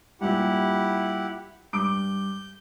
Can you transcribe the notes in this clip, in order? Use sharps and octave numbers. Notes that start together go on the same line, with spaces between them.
G2 A#2 E4 G4 F#5
G2 D6 G6 D7